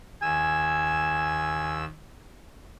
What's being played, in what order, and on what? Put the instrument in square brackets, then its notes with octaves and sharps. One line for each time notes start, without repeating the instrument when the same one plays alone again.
[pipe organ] D#2 E6 [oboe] G#5